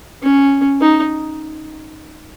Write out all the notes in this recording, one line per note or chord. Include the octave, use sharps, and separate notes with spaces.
C#4
D#4